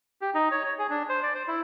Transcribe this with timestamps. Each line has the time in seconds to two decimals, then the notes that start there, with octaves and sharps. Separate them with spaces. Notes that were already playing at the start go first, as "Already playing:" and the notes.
0.21 G4
0.34 D#4
0.51 C#5
0.66 C#5
0.79 G#4
0.90 D4
1.09 C5
1.23 D5
1.35 C5
1.48 E4